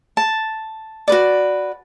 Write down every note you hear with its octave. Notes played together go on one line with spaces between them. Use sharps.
A5
F#4 B4 D5